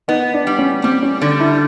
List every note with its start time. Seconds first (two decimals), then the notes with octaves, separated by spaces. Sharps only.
0.08 B3 D#4
0.34 D4
0.47 G3
0.59 C#4
0.84 G3 C4
1.02 C#4
1.21 D3 D4
1.40 E4